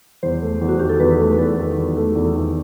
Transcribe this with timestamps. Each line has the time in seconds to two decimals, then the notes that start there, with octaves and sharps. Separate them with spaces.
0.23 E2 C5
0.42 A3
0.61 E2
0.68 F#4
0.79 D#3 G4
0.89 A4
1.00 E2 B4
1.19 A3
1.32 B4
1.38 E2 A4
1.58 D#3
1.77 E2
1.97 A3
2.16 E2
2.36 D#3